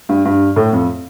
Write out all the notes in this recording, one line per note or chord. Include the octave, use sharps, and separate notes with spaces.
G2
G2
A2
F2